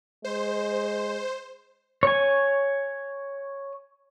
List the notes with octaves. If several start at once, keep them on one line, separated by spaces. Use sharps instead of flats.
G#3 C5
C#5 G#5